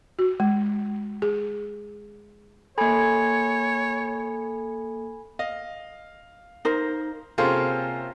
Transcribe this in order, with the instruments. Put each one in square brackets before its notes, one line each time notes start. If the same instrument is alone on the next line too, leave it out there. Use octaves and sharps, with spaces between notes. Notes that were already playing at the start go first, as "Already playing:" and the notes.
[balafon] F#4
G#3
G#4
[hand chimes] A#3 A4 [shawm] C#5 [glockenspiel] G#5 B5 G#6
[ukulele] D#5 [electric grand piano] F5
[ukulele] D#4 A#4 C5
[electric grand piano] C3 C5 G5 [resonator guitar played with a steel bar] A#3 C#4 F4 [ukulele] G#4 A4